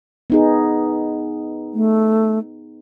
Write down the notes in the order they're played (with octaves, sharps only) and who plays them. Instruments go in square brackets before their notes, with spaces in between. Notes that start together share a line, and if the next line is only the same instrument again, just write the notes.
[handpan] B3 D#4 G#4
[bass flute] A3